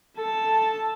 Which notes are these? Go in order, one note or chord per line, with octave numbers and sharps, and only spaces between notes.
A4 A5